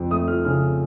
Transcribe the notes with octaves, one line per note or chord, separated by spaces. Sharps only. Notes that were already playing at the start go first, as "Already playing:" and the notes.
Already playing: F2
A3 D#6
F3 F6
C#3 F6